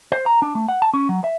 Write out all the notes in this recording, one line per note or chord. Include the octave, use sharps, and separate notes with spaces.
C5
A#5
D4
A3
F#5
A5
C#4
F#3
E5